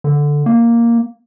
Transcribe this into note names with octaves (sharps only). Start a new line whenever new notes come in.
D3
A#3